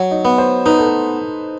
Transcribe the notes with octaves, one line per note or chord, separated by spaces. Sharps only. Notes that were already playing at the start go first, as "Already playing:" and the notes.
Already playing: F#3
D#4
B3
C5
D#4 B4
A4
B4